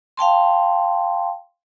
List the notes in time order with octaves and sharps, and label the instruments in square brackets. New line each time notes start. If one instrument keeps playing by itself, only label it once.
[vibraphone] F5 G5 A5 C6